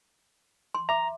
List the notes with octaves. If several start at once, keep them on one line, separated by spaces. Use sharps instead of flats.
C6
E5 A#5 D6